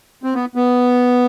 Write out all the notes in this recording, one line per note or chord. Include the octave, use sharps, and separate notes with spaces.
C4
B3
B3